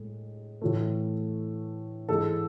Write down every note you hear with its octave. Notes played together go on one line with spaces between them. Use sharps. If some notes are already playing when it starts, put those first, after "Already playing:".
Already playing: A2 G#3
A2 E3 A3
G#2 E3 G#3 A4